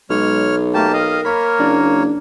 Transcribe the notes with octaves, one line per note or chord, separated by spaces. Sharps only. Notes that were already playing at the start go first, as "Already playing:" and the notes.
B1 G#3 C#5 F6
A3 A#3 G4 G5 A5
A#4 D#5 F5
A#3 C#5 B5
F#1 D4